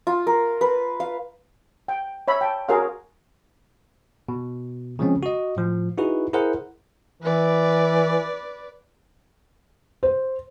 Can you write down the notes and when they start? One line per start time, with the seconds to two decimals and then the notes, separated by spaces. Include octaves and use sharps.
0.07 F4
0.27 A#4
0.61 B4
1.00 F5
1.88 G5
2.28 C#5 E5 B5
2.41 G5 A5
2.68 F#4 G#4 A#4 C#5 F5 C6
4.29 B2
4.99 C#3 F3 G#3 C4 C#4
5.23 F#4 D#5
5.57 A2 F3
5.98 D#4 E4 F#4 G#4 B4
6.33 E4 G#4 A#4 C5 F#5
7.23 E3 B4 D5
10.03 C5